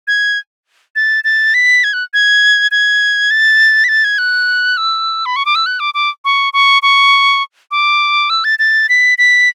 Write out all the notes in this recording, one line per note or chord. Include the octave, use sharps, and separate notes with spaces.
G#6
A6
A6
B6
G#6
F#6
G#6
G#6
A6
B6
A6
G#6
F#6
E6
B5
C#6
D6
E6
F#6
D6
D6
C#6
C#6
C#6
D6
E6
A6
A6
B6
B6